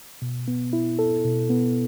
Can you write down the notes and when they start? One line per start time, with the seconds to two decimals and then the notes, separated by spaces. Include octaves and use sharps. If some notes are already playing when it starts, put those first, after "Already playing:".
0.22 B2
0.48 B3
0.73 E4
0.99 A4
1.25 B2
1.50 B3